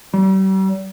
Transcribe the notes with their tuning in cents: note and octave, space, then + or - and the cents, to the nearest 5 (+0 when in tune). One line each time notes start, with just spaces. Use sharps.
G3 -40